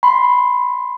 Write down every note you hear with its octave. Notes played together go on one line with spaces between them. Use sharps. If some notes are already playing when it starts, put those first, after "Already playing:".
B5 C6